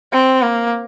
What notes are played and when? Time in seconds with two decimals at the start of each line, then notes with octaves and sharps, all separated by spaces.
0.12 C4
0.42 A#3